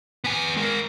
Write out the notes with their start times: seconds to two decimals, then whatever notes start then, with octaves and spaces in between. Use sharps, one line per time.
0.24 B3 G#5
0.57 G#3 A#4